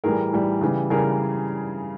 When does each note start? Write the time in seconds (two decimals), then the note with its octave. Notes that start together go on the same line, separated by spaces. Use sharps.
0.04 A2 E3 G3 G#4 A#4
0.32 A2 E3 G3
0.61 C#3 E3 G3
0.90 C#3 E3 G3 G#4 A#4